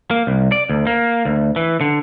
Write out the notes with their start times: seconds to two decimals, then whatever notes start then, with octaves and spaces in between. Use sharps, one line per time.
0.11 A#3
0.27 C2
0.52 D5
0.69 D2
0.87 A#3
1.25 D2
1.56 E3
1.81 D3